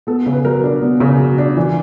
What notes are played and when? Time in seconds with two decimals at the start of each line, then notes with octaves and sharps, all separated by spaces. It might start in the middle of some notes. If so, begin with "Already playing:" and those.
0.07 B3 A4
0.26 C#3
0.33 B4
0.45 F#3 A#4
0.63 D4
0.82 B3
1.00 C#3
1.19 F#3
1.38 D4
1.56 E3